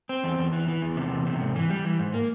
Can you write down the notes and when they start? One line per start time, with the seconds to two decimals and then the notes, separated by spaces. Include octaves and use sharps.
0.09 C4
0.24 E2
0.39 E2
0.53 E3
0.68 E3
0.82 E2
0.97 C3
1.12 E2
1.26 C3
1.41 G#2
1.56 E3
1.70 G3
1.85 E3
1.99 G#2
2.14 A#3